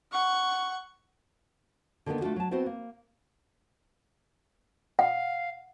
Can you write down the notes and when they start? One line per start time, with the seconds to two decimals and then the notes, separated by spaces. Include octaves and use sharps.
0.12 F#5 C#6
2.06 D3 D#3 G3 A#3 B3 D4
2.21 A3 D4 F4 F#4
2.36 F#3 A5
2.51 B3 C4 E4 F#4 C5
2.66 A#3
4.99 F5 F#5